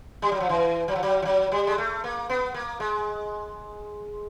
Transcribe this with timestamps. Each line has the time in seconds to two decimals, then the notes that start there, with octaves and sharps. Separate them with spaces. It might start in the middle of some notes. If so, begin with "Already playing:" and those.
0.22 G3
0.32 F#3
0.40 F3
0.49 E3
0.88 F#3
0.96 F3
1.03 F#3
1.22 F3
1.25 F#3
1.52 G3
1.67 G#3
1.78 A3
2.04 A#3
2.29 B3
2.54 A#3
2.80 G#3